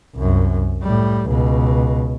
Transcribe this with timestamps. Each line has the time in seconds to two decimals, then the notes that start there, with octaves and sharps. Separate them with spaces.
0.15 C2 F#2
0.83 A2 G3
1.28 C#2 B2